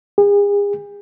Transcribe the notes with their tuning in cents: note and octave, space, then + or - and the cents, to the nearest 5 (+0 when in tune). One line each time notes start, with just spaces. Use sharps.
G#4 -40